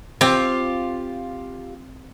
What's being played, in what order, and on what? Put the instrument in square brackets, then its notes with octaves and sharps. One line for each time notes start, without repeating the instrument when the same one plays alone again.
[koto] C4 [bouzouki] F4 G4